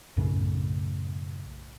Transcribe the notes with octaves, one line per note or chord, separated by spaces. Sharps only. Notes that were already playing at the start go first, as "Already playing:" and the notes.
B1 F#2 A2 C#3